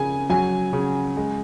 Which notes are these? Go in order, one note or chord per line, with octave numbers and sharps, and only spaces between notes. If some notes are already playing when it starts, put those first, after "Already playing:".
Already playing: C#3 G#5
F#3 G#5
C#3
G#3